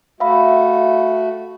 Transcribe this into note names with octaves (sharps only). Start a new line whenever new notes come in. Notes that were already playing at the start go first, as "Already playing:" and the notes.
A3 F#4 E5 F5 B5